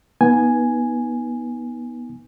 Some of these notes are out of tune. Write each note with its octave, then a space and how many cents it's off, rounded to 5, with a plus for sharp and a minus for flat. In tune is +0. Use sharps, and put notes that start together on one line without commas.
B3 -20 D#4 +20 G#5 +0